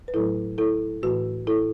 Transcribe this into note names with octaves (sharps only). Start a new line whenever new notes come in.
B4
A2 F#3 A3 E4 A4
E4 A4
A2 E3 A3 F#4 B4
E4 A4